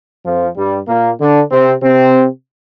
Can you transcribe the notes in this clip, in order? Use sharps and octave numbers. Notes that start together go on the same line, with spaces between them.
F2 F3
G2 G3
A#2 A#3
D3 D4
C3 C4
C3 C4